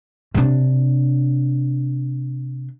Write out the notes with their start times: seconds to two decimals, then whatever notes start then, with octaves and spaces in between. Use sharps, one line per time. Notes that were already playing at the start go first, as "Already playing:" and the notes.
0.34 C3 D4